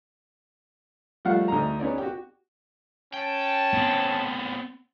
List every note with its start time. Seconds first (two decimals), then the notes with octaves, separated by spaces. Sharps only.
1.25 F3 G3 A3 F5 F#5
1.48 D2 D#4 A#5
1.79 B3 C#4 D#4 D5
1.98 F#4 G4
3.14 C#4 G5 A5
3.74 B3 C4